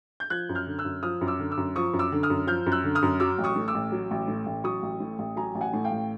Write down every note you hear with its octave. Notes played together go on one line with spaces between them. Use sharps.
G6
F3 F#6 G#6
F#2
F6 G6
D3
E6 F#6
F#2
F3 D#6 F6
F#2
D6 E6
D3
D6 E6
F#2
F3 C#6 D#6
F#2
D6 E6
D3
D#6 F6
F#2
F3 F6 G6
F#2
E6 F#6
D3
D#6 F6
F#2
F#3 D6 E6
A1
C#6 D#6
A2
D6 E6
A1
F#3
A1
A2
A1
F#3 C#6 D#6
A1
A2
A1
F#3 G#5 A#5
A1
F#5 G#5
A2
F5 G5
A1